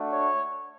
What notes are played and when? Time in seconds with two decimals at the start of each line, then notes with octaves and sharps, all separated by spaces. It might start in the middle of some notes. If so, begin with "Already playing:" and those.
Already playing: A3 D4 F#4
0.12 C#5